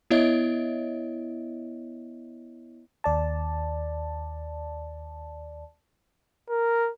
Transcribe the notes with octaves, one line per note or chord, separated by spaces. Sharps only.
B3 E4 C#5 D#5 E5
D#2 D5 A5
A#4